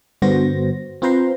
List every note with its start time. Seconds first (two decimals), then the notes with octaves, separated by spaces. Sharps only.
0.22 G2 D3 B3 F#4 C5 A#6
1.02 C4 F4 B4 C5 A#5 C6